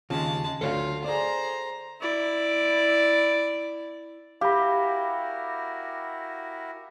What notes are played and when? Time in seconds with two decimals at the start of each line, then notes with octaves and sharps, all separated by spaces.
0.10 D#2 C#3 G#3 F4 A5
0.61 D2 F4 A4 C#5 F5
1.04 G#4 C5 D5 A#5
2.01 E4 D5
4.41 E4 F#4 G4 A#4 F5 B5